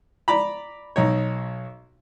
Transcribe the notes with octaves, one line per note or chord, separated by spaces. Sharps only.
D5 A#5 B5
B1 D#4 C#5